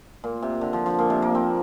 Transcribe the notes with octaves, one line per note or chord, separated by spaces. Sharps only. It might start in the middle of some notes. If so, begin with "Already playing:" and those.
A#2
C3
D3
F3
F3
A#2
C3
A#3
C4